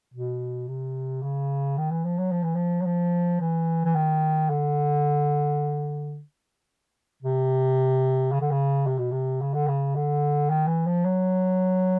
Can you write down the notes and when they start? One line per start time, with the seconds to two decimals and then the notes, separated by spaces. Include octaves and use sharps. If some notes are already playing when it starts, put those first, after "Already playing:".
0.14 B2
0.68 C3
1.23 C#3
1.78 D#3
1.91 E3
2.05 F3
2.18 F#3
2.31 F3
2.43 E3
2.55 F3
2.81 F#3
2.86 F3
3.41 E3
3.85 E3
3.95 D#3
4.50 D3
7.23 C3
8.32 C#3
8.41 D3
8.51 C#3
8.86 C3
8.99 B2
9.12 C3
9.41 C#3
9.54 D3
9.68 C#3
9.95 D3
10.50 D#3
10.68 E3
10.86 F3
11.05 F#3